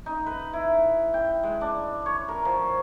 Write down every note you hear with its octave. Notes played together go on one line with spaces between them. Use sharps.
D#4
B4
E4
G5
G#3
D4
C#5
A#4
F3